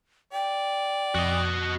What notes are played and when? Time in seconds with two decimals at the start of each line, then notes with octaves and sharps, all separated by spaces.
0.33 D5 G5
1.15 F2 F#4 D#5